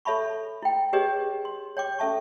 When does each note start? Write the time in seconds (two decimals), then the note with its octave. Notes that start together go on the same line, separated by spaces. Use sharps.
0.05 A4 C#5 E5 A5 B5 C#6
0.63 E4 G5
0.93 G4 G#4 B4 C#5 D#5
1.45 C6
1.77 C#5 G5 D6
1.99 C#4 A4 E5 A5 C#6